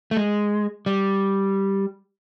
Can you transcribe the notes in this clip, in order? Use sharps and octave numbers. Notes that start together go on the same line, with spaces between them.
A3
G#3
G3